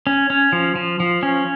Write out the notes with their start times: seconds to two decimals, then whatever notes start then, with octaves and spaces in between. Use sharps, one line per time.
0.07 C#4
0.30 C#4
0.53 F3
0.76 F3
1.00 F3
1.23 C#4